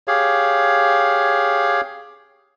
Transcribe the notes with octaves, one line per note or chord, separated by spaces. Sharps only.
G4 G#4 C#5 F5